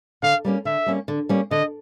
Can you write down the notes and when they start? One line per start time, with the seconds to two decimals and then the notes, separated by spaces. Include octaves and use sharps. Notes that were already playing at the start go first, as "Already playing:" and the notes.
0.23 D3 F5
0.45 G3 A#3 C#4
0.65 D3 E5
0.86 G3 A#3 C#4
1.08 D3
1.29 G3 A#3 C#4
1.51 D3 D#5